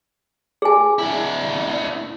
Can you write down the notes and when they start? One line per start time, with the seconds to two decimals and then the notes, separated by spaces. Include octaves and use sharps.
0.62 G#4 G#5
0.99 D4 E4